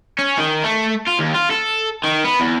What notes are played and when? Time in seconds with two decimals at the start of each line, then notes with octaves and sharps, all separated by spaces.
0.19 C#4
0.38 D#3
0.64 A3
1.07 F4
1.19 D#2
1.34 F4
1.51 A4
2.05 D#3
2.25 B3
2.40 E2